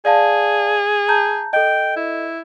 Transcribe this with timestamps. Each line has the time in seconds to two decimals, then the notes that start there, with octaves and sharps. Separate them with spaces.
0.05 G#4 D5 F5 A5
1.08 A5 A#5 G6
1.53 A4 D#5 G5
1.96 E4